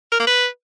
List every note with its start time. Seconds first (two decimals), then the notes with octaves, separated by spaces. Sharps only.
0.12 A#4
0.20 A#3
0.27 B4